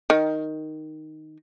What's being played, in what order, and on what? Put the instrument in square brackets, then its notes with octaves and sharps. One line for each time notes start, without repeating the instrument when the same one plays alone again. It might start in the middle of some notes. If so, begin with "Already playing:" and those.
[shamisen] D#3